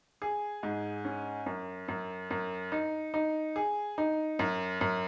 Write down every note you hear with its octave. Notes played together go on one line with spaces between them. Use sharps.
G#4
G#2
C#4
F#2
F#2
F#2
D#4
D#4
G#4
D#4
F#2
F#2